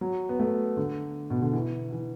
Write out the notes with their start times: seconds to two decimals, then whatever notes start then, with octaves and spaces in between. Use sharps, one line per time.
0.01 F#3
0.29 B3
0.40 A3
0.77 D3
1.30 B2
1.42 D3
1.53 E3
1.92 E3